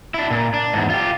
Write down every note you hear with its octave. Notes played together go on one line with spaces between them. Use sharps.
D4 E4
A#2
D4
E2 G#2
F4 G4